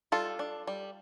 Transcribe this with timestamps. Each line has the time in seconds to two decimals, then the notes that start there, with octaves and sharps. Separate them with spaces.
0.12 G3 F4 A4
0.39 D4
0.67 G3